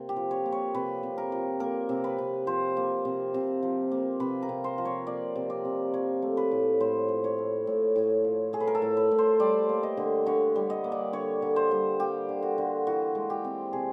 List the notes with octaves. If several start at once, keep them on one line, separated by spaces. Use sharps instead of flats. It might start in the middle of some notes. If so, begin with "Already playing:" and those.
Already playing: C3 A#3
G4
F3
C#5
A#3
C#5
C3 B4
C3
A#4
F3
A#3 A#4
C3
B4
C3
F3 C5
A#3
C3
C3
F3
A#3
C3 B4
A#4
C3
C5
F3
C#5
A#3 D5
C3
D5
C3
F3 C#5
A3
B4
A2
A2 C5
F3
C#5
A3
A2
A2
F3
A3 G#4
B4
A#4
A4
A2
B4
A2
C5
G3 D5
A#3
D#5
D3
D3 C#5
G3
D#5
A#3
D5
D3 C#5
D3
C5
G3
A#3 G4
D3
F#4
D3
E3 F#4
G#3
G4
C4
C3 G#4